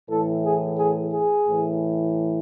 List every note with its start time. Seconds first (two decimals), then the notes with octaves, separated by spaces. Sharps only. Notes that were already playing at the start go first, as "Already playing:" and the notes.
0.10 A2 E3 A4
0.46 G#4
0.79 G#4
1.13 G#4
1.48 A2 E3